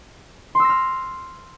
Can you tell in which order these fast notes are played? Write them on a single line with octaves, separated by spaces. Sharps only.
C6 E6 A#6 F6